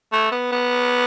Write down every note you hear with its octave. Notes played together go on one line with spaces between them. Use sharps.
A3
B3
B3